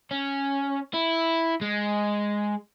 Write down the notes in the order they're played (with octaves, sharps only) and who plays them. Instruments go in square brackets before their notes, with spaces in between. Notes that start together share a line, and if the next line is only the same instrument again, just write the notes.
[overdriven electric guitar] C#4
E4
G#3